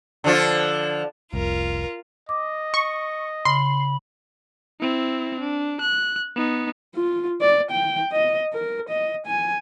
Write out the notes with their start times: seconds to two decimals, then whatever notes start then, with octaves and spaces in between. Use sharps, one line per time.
0.24 D3 F3 F4
1.34 F1 C2 F4 A#4
2.29 D#5 D6
2.74 C#6
3.45 C#3 B5 C6
4.80 C4 E4
5.40 D4
5.81 F#6
6.36 B3 D#4
6.95 F4
7.41 D5
7.71 G5
8.12 D#5
8.54 A#4
8.89 D#5
9.27 G#5